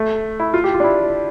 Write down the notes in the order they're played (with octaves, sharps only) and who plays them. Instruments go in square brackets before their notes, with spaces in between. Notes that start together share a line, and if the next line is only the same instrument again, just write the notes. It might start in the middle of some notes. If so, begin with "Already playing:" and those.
Already playing: [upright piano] A3
E4
F4
G4
F4
D4
E4